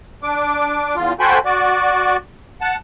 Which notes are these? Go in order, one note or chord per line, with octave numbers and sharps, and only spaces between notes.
D4 D6
E2 F4
F#4 A4 C5 G5 G#5 B5
F#4 D5
F#5 A5